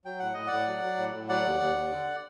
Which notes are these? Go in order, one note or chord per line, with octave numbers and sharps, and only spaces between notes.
F#3 G5
A2 F#5
A2 D#5
A2 D5 F#5
F#3
F#3
A2
A2
F#3 D5 F#5
D#2
D#2
D#2
D3